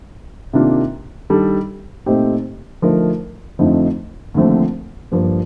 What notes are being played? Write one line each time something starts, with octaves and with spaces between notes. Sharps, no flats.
C3 D#3 A#3 D4 F4
D#3 G3 D4 A4
A#2 A3 C4 D#4 G4
D3 F3 A3 D#4 A#4
F2 D3 F3 A3 D#4
D#2 D3 F3 A3 C4
G2 F3 A#3